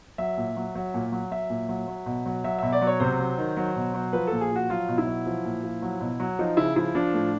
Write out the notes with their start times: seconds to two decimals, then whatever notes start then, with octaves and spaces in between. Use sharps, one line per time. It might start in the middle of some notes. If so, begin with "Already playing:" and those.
0.18 F#3 E5
0.37 A#2
0.57 F#3
0.75 F#3
0.94 A#2
1.12 F#3
1.31 F#3 E5
1.50 A#2
1.69 F#3
1.88 F#3
2.06 B2
2.26 F#3
2.44 F#3 E5
2.58 B2 E5
2.72 D5
2.82 F#3
2.87 C#5
3.00 C3 C5
3.19 F#3
3.38 D#3
3.57 F#3
3.76 B2
3.94 F#3
4.13 F3 B4
4.27 A#2 A4
4.41 G#4
4.51 F3 F#4
4.70 F#3 F4
4.88 B2
4.98 E4
5.07 F#3
5.26 F3
5.45 A#2
5.64 F3
5.82 F#3
6.01 B2
6.20 F#3
6.39 F3 D#4
6.57 C#3 E4
6.76 F3 E4
6.95 F3 D4
7.14 A2